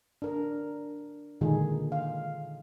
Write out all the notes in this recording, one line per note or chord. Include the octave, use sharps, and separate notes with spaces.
D4 A#4
A#2 D3 D#3 G#3 D#4 G#4
F5